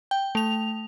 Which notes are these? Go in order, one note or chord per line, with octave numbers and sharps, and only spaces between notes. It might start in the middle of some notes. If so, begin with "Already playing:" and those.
G5
A3 F7